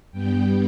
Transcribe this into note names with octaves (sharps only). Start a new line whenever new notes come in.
G2 G3 B3 G5